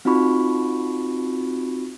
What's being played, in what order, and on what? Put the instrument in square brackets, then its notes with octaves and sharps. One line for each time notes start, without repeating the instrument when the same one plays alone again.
[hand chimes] C4 D#4 F4 F#4 B5 C#6